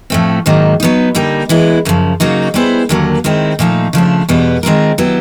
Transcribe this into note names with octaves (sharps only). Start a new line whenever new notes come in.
A2 F3 A3 C4
G#2 D#3 F#3 A#3
F#3 B3 D#4
D3 G3 A#3 D#4
E3 G#3 B3 E4
F#2 C#3 F3
C#3 F#3 A#3 D#4 F#4
G3 B3 E4 G#4 C5
D#2 D3 F#3 A#3
D#3 G#3 C4 E4
A#2 F3 A3 C4 D#4
C#3 F3 A3 D4
E2 B2 G3 B3
D#3 G#3 C4 F4 A#4
F#3 B3 E4 G4